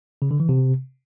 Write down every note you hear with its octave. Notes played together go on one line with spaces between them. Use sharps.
C#3
D3
E3
C3